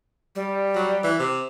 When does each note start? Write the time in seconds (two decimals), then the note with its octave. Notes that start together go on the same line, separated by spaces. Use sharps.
0.35 G3
0.75 F#3
1.03 E3
1.19 C3